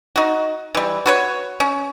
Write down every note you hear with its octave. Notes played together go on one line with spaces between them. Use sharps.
D#4 F#4
E3 G3
F#4 B4 C#5
C#4